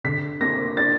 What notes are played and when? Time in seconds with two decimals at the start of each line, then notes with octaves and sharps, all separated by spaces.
0.04 D3 B6
0.41 A#3 A#6
0.77 D4 A6